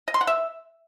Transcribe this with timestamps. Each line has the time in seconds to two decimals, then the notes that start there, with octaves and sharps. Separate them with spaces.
0.08 D#5
0.14 C6
0.21 F#5
0.27 E5